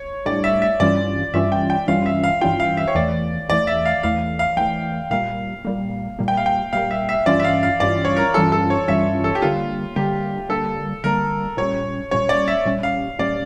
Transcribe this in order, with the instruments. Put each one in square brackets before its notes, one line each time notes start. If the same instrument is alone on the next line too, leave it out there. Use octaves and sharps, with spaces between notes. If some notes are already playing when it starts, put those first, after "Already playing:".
Already playing: [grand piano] C#5
[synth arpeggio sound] A2 G3 D4 [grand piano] D5
[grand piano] E5
E5
[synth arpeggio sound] G2 E3 G3 C#4 F4 [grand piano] D5
[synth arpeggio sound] G2 E3 G3 C#4 F4 [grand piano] E5
[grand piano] G5
G5
[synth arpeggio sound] G2 E3 G3 C#4 F4 [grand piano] F5
[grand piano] E5
F5
[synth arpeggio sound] G2 E3 G3 C#4 F4 [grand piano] G5
[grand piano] F5
E5
C#5
[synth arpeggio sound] E2 E3 A3 [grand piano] D5
[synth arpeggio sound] E2 E3 A3 [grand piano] D5
[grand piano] E5
F5
[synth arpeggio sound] E2 E3 A3 [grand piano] F5
[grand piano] F5
[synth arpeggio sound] E2 E3 A3 [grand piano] G5
[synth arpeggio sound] A#2 G3 A#3 [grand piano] F5
[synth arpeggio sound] A#2 G3 A#3
A#2 G3 A#3
[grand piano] G5
F5
G5
[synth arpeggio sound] A#2 G3 A#3 [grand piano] F5
[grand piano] E5
E5
[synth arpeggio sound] G2 E3 G3 C#4 F4 [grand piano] D5
[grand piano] E5
F5
F5
[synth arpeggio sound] G2 E3 G3 C#4 F4 [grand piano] D5
[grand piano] C#5
A#4
[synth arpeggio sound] G2 E3 G3 C#4 F4 [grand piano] A4
[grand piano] A4
C#5
[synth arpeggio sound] G2 E3 G3 C#4 F4 [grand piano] E5
[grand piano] A4
G4
[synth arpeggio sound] D3 G3 A#3 [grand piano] F4
[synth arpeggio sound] D3 G3 A#3 [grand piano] G4
[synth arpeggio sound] D3 G3 A#3 [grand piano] A4
[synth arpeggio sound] D3 G3 A#3 [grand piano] A#4
[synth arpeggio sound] A#2 G3 C#4 [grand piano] C#5
[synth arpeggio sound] A#2 G3 C#4 [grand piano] C#5
[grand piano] D5
E5
[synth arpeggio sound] A#2 G3 C#4
[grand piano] F5
[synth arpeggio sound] A#2 G3 C#4 [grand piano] D5